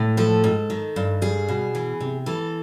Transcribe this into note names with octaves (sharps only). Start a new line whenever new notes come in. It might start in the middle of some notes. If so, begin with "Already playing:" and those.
Already playing: A2
F3 A4
G#2
D#3
G2
G3 G#4
B2
E3
C3
E3 A4